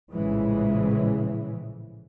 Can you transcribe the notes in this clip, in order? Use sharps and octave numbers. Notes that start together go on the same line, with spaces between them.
A#1 A2 C#3 E3 G#3